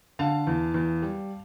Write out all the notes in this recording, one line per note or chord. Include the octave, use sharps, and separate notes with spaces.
D3 F5 A5
E2
E2
G3